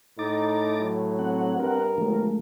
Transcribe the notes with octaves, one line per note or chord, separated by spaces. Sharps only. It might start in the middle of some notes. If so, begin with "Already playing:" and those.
A2 D#4 A#5 D6 A6
F#3
C4 F#5
G2 A#4
G1 F3 G#3 A3